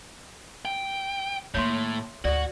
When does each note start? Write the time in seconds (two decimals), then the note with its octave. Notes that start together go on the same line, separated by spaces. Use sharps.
0.65 G5
1.54 A2 D#3 A#3 C#5 E5 C6
2.25 D2 G#2 F#4 D5 F#5